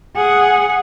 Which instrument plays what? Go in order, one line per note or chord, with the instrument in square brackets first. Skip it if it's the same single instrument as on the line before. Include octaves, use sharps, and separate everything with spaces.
[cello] G#4 F#5